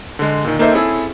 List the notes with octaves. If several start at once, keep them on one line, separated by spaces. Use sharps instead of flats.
D3 G#3
A#2 D#3
A#3 D#4 A4 C5 E5
C4 C#4 E4 G#4 A4